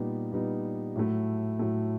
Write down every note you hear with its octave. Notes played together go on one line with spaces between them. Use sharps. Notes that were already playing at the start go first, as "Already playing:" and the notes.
Already playing: A#2 G3 B3 D#4
A#2 G3 B3 D#4
A2 F#3 A3
A2 F#3 A3